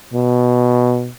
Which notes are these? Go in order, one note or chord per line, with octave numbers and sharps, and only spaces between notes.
B2